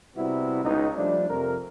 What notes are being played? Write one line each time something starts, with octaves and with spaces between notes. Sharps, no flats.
C3 G3 B3 E4 F#4
C#2 B2 D#4
F3 G3 A3 D4
F2 C3 A#4